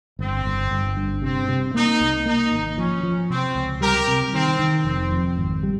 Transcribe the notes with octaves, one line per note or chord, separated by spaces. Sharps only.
G1 C4
G1
G1
G2
C3 C4
C3
A#3 D#4
C2
A#3 D#4
G#1
F3 C#4
F3
C3 C4
C#2
G3 G4 A#4
C3
D#3 C4
D#3
F1 C4
F2
G#1
G3